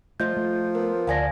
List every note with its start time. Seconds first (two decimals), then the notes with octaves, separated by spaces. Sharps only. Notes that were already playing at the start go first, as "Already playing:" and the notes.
0.20 F3 A3 F4 D#5 E5 G6
0.37 A3
0.75 B3 A#4
1.07 D2 D5 F5 F#5 G#5 A5 A#6